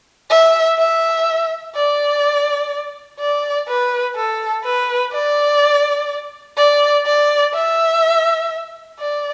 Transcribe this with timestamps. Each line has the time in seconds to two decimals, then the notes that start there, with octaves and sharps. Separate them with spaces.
0.30 E5
0.79 E5
1.75 D5
3.20 D5
3.68 B4
4.16 A4
4.65 B4
5.13 D5
6.58 D5
7.06 D5
7.54 E5
8.99 D5